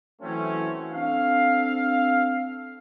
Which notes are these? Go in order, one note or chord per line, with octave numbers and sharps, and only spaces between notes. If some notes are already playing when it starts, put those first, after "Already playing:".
E3 F#3 A3 C4 C#4
C4 D4 A4 F5